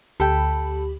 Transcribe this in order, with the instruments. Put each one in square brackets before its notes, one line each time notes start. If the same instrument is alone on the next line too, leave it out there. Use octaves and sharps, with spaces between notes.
[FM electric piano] D2 G4 B5 [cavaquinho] A4 G5